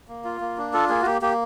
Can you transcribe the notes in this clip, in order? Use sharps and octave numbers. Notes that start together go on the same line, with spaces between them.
A#3
F4
A#3
D4
F4 A4
A#3 G#4
F#4
A#3 G4
A#3 G4